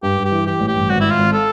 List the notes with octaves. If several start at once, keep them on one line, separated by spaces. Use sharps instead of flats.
G2 G4
G2
G4
E3
E3 G4
A1
G4
G2
G#1 F#4
G#1 E4
F4
G#1
A4